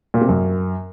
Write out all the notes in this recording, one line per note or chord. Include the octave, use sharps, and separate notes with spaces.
A#2
C3
F#2